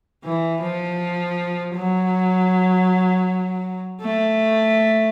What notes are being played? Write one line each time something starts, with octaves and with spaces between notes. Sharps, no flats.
E3
F3
F#3
A3